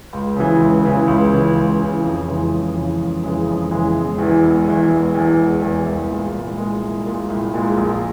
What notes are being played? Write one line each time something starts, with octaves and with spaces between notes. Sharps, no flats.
C#2
C#3 E3
C#2
C#3 E3
C#2
C#3 E3
C#2
C#3 E3
F2
C#3 E3 G#3
F2
C#3 E3 G#3
F2
C#3 E3 G#3
F2
C#3 E3 G#3
E1
E2 E3
E1
E2 E3
E1
E2 E3
E1
E2 E3
C2
A#2 G#3
C2
A#2 G#3
C2
A#2 G#3
C2
A#2 G#3
A#1